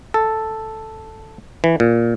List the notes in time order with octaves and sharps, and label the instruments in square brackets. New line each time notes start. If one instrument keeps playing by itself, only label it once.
[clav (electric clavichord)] A4
E3
A#2